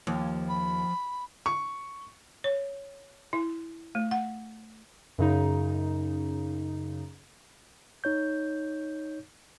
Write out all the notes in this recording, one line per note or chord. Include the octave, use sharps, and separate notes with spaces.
D#2 F3
B5
C#6
C#5
E4
A3
F#5
F#2 C#3 D#4
D#4 C#5 G6